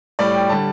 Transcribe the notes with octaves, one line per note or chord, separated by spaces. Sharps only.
A2 G3 D5
G5
D3 G3 A5